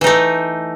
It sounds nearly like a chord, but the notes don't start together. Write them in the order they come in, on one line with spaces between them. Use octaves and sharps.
E3 D#4 A3